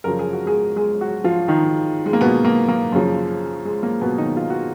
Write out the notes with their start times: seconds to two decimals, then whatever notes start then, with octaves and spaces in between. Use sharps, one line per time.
0.04 F#2 C#3 F3 A#4
0.19 G#4
0.33 F#4
0.46 G#3 G#4
0.76 G#3 G#4
1.01 F#3 F#4
1.24 F3 F4
1.48 D#3 D#4
2.06 G#3
2.13 A#3
2.21 B2 B3
2.45 A#3
2.68 A#3
2.92 F#2 C#3 F3
3.65 G#3
3.83 A#3
4.01 B2 B3
4.18 D#3 D#4
4.37 F4
4.50 F#4